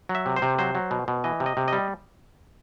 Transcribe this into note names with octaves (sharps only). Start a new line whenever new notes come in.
F#3
E5
C3
C5
C3
F#3 C5
F#3
B2
B2
E3 D#5
C3
D#5
C3
G3 D#5